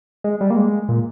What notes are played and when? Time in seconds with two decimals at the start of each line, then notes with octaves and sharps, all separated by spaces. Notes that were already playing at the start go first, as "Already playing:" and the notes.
0.24 G#3
0.41 G3
0.50 A#3
0.57 G#3
0.89 A#2